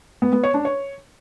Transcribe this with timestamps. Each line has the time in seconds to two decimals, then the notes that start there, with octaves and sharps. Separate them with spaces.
0.22 B3
0.33 B3
0.43 C#5
0.54 D4
0.65 C#5